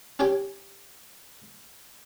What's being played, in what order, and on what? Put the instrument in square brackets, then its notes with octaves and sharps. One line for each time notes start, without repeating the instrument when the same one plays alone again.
[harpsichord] C#4 G4 G5 G#5